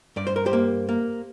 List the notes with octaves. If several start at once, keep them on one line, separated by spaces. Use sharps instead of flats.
G2 D5
C5
A#4
G4 C5
A#3
A#3